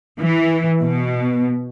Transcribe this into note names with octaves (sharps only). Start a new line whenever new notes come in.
E3
B2